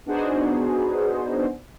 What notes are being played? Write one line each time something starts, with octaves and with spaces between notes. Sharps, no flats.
B3 D4 D#4 F#4 G#4 C5